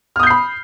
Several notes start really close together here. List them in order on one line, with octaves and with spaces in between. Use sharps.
F6 D#6 G6 C7 B5